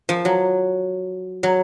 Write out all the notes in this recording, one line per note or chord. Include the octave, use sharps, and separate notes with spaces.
F3
F#3
F#3